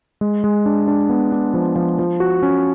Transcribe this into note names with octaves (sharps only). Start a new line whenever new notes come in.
G#3
G#3
D4
D4
B3
D4
F3
F3
F3
F#4
C#4